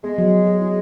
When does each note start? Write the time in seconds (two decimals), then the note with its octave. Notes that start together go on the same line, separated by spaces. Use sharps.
0.04 G#3 B3
0.18 F#3
0.33 G#4
0.47 G#4
0.61 E4